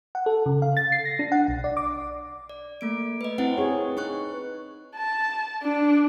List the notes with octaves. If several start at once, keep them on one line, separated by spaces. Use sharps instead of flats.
F#5
A4
C#3
F5
A6
C7
A#6
D4
F#5
B1
D5
D6
D5
A3 A#3 D7
B4 D#5
C4 E4 B4 F#5
C4 G#4 C#5
D#4 B4 C#6 F#6
A5
D4